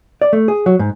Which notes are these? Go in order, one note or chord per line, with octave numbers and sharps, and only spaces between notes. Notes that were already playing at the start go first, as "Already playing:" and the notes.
D5
A3
G#4
F#3
G#2